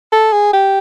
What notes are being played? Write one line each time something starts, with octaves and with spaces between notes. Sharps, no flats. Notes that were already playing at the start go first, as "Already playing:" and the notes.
A4
G#4
G4